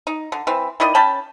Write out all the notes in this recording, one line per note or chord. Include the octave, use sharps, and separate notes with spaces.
D#4
D3
E3 C4
D#3 E4 D5 D#5
C#4 G5 A5 B5